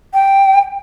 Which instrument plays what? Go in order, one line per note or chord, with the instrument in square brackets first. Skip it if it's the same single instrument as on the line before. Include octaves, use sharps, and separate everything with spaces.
[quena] G5